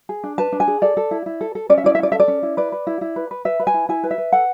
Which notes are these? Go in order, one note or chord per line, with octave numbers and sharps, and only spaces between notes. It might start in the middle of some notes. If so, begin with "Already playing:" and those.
G#4
D4
B4 A5
D4
G#5
G#4
A4 D5
A4
E4
E4
A4
A4
C#4 D5
E5
E4 D5
E5
C#4 D5
A4 E5
D5
C#4
E4
B4 D5
B4
E4
E4
B4
B4
B4 E5
B4
G#5
E4
E4 G#5
B4
E5
B4
A4 F#5